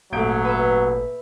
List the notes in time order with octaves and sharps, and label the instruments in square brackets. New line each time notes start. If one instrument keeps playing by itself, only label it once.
[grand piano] D#1 G6 D7 [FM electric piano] G#1 A3 [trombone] F#3
[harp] B4 E5